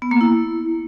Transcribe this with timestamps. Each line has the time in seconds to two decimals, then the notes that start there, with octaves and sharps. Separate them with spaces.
0.02 B3
0.11 A#3
0.21 E4